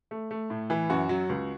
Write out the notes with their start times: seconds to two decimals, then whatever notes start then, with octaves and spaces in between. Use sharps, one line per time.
0.11 A3
0.31 A3
0.50 A2
0.70 E3 B4
0.89 F#2 F#4
1.09 F#3
1.29 C#2